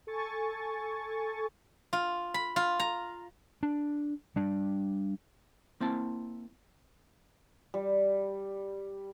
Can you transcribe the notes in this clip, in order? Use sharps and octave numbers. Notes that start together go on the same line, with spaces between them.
A4 G#5 C#6 A6
F4
B5
F4
A#5
D4
G3 D4
A#3 C4 E4 A5
G3